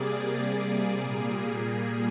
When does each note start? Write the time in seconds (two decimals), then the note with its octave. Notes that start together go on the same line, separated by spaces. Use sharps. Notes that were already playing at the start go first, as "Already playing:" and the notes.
Already playing: C3 G3 A#3 G#4 D5
1.01 A#2 G3 A#3